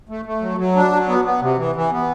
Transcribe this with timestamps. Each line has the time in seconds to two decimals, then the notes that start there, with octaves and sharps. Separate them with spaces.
0.09 A3
0.25 A3
0.42 F#3
0.58 F#3
0.75 D4
0.92 F#3
1.08 B3
1.25 B3
1.42 C3
1.57 E3
1.75 E3
1.91 B3